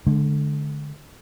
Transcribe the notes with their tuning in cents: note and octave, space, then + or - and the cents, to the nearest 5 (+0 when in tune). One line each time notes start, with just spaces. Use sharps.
D3 +0 G#3 +45